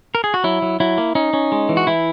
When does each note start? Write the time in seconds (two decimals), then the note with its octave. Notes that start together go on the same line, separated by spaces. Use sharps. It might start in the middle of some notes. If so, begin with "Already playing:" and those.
0.15 A#4
0.24 G#4
0.34 F#4
0.44 F#3 E4
0.62 F#3
0.80 F#3 E4
0.98 A#3
1.15 C#4 D#4
1.33 C#4
1.52 G#3
1.69 E3
1.77 F#4
1.87 E3 E4